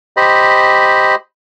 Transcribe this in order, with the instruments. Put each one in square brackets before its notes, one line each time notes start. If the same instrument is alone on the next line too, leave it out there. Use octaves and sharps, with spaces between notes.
[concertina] G4 C5 D#5 B5